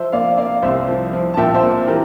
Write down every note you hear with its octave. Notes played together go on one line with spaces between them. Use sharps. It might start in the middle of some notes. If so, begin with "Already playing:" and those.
Already playing: F3 C5 E5
A#3 D5 F5
A#3 D5 F5
C2 C5 E5
F3
F3
A5
A#2 E5 G5
C5 E5
A#3
E3 G4 A#4